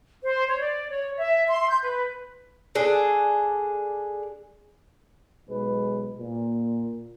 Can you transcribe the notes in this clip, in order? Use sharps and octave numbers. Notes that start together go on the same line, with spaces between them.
C5
C#5
D5
C#5
E5
C6
G6
B4
D4 G#4 A4
B1 G#3 B4
A#2